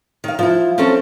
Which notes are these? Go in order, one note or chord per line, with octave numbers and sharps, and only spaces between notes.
D#3 F5
F3 E4
C4 C#4 A4 C5 A5